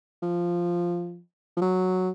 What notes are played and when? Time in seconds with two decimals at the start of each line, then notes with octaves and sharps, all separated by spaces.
0.22 F3
1.57 F3
1.61 F#3